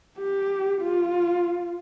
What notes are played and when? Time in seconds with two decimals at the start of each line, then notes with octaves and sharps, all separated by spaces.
0.19 G4
0.81 F4